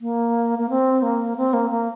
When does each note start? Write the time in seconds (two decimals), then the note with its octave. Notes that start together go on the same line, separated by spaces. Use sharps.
0.01 A#3
0.59 A#3
0.69 C4
1.02 A#3
1.37 C4
1.53 A#3
1.70 A#3